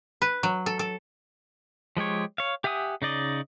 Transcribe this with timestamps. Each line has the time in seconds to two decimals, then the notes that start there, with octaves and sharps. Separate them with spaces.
0.22 B4
0.43 F#3
0.66 A4
0.79 A4
1.97 F3 G#3 G4 C#5
2.38 C#5 F5
2.64 G4 E5 F#5 G#5 D#6
3.02 C#3 D#4 D5 D#5